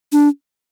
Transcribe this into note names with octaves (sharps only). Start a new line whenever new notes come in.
D4